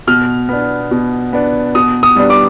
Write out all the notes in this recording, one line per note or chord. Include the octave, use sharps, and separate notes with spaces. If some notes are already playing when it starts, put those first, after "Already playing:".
B2 F6
B3 D4
B2
B3 D4
B2 D#6
D#6
G3 B3 D4
D6